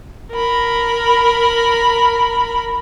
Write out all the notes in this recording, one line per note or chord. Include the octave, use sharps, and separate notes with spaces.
A#4 B5